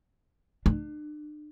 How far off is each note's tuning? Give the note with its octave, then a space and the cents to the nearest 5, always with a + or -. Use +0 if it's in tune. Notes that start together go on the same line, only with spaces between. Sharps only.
D4 +40